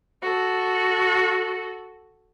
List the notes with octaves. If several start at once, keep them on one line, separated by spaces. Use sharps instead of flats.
F#4 A4